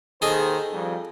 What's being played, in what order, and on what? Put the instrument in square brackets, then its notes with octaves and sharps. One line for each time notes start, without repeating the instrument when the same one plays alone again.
[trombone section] D#2 D#3 C5 [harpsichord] G#4 A4 D#5
[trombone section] F2 G3